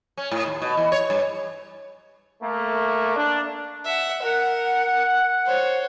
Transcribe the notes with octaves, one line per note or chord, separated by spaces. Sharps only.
C#4
A2
D#2
B2
E3
C#5
G2
A3 A#3
D4
E5 F#5
A#4 F#5
C5 C#5